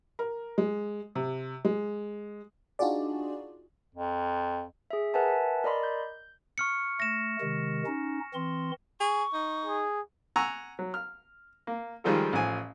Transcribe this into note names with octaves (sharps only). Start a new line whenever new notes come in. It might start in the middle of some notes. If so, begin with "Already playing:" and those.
A#4
G#3
C3
G#3
D4 D#4 F4 F#4 G#4 D5
F2
G#4 E5
A#4 B4 E5 F#5 G#5 A5
A#4 D5 D#5 B5 C6
G6
C#6 F6 C#7
A3 A#6 E7
C3 D#3 G#3
C#4 D#4
E3 C4 C6
G#4 C#6
D#4
G#4
F#5 G#5 A#5 C#6 E6
F#3
F6
A#3
D#3 F3 G3 G#3 F4 A4
A1 F3 G#5